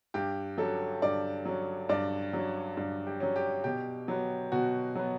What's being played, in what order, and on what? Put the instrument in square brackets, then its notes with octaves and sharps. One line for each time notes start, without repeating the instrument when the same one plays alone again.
[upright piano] G2 G4
F#3 C#4 A4
G2 D5
F#3 C#4
G2 D5
F#3 C#4
G2
G4
F#3 C#4
G4
B2 G4
F#3 B3
B2 F#4
F#3 B3